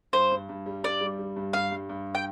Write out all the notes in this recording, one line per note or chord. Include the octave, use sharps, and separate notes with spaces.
G2 C5
G2
G2
G3
G2 D5
G3
G3
G2
G2 F5
G2
G2
G5